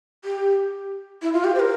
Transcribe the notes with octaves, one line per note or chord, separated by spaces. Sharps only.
G4
E4
F4
G4
C5
A#4